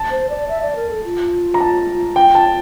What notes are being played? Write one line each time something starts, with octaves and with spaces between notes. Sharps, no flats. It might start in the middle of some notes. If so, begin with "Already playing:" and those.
Already playing: A5
C5
D5
E5
D5
A#4
A4
F4
A#5
A5
G5
A5